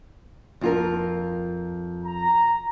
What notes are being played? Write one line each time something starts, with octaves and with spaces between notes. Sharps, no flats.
F2 F4 A#4
A#5